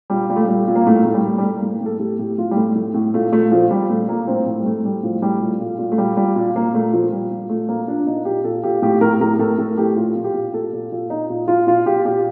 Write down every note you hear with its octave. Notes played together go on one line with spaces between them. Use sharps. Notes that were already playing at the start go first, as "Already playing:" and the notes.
A#2 G3
A#2 G3
A3
A#2 G3
A#2
A#3
A2 A3
A2 A3
G3
A2
G3
A2 A3
A2 A#3
A#3
A2
A4
A2 G4
A2 G4
A2 F4
G3
A2 A3
A2
A2
A#2 A3
A#2 A3
A#2 F3
A#2 G3
A#2 A3
A#2 A#3
A2 C4
A2
G3
A2 A3
A2 G3
A2 F3
A2 G3
A#2 A3
A#2
A#2
A3
A#2 G3
A#2 G3
A#2
A#2 A#3
A#2 A3
A#2 F3
A#2 G3
A#2
A#2 A3
A#2 A#3
A#2 D4
A#2 D#4
A#2 G4
A#2 A4
A#2 G4
A2 G4
A2 A#4
A2 A#4
A2 A4
A2 A4
A2 G4
A#2 F4
A#2
G4
A#2
A#2 A4
A#2
A#2
A#2 D#4
A#2
A#2 F4
A#2 F4
A#2 G4
A#2 G4